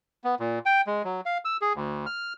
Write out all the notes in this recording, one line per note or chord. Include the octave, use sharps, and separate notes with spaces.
B3
A#2
G5
G#3
F#3
F5
E6
G#4
D2
F6